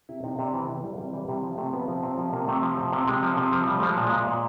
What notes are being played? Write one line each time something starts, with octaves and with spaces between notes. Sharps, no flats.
C3 E4
C3 D#4
C3 D4
E3 C4
E3 B3
E3 G3
F#3
C3 G3
E3 G3
C3 G3
F3
C3 A3
F3 B3
F3 C4
C3 C4
F3
C3 A#3
C3 A3
F3
F3
C3
C3 G#3
F3
C3
F3
F3 G3
A3
F3 G#3
A#2
G#3
A#2
A#2